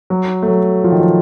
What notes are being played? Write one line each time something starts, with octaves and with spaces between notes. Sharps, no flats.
F#3
A3
F#3
F3
D#3
F3